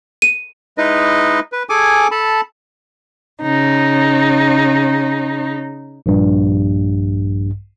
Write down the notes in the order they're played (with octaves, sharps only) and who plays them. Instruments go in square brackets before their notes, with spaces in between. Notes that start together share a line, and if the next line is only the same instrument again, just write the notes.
[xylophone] D#7
[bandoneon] G#3 D#4 E4 B4 D#5
B4
G#4 A4 G#5 D6
A4 A5 B5
[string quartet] C#3 D#4
[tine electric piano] A#1 G2